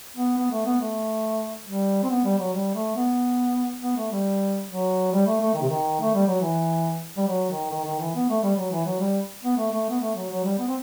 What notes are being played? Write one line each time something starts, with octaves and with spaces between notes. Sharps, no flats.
B3
B3
A3
B3
A3
G3
C4
B3
G3
F#3
G3
A3
B3
B3
A3
G3
F#3
G3
A3
A3
D#3
C3
D#3
A3
G3
F#3
E3
G3
F#3
D#3
D#3
D#3
E3
B3
A3
G3
F#3
E3
F#3
G3
B3
A3
A3
B3
A3
F#3
F#3
G3
B3
C4